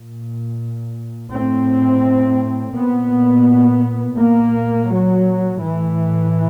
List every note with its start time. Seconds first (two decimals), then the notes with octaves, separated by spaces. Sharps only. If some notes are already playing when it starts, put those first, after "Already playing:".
Already playing: A#2
1.31 A2 C4
2.74 A#2 B3
4.17 A#2 A#3
4.89 F#3
5.59 A2 E3